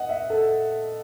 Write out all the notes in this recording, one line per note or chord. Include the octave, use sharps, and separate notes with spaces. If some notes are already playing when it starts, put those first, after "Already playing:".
Already playing: D#5 F#5
E5
A4